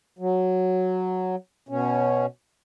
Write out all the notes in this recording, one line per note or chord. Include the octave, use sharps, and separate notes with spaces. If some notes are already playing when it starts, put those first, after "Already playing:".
F#3
B2 C#4